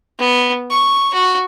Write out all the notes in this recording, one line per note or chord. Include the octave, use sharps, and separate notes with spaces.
B3
C#6
F#4